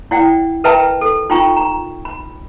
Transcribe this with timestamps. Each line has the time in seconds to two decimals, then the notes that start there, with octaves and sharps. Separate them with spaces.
0.11 E4 D5 F#5 G5
0.64 A#4 B4 E5 G5 A5 A#5
1.01 A4
1.30 D#4 F4 G5 A#5 C#6
1.57 A#5
2.05 B5